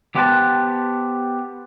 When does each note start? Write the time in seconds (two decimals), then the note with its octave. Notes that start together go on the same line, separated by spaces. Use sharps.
0.15 B3 G4 C5 F#5 G5 A5